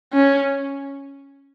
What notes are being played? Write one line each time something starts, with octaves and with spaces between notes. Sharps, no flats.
C#4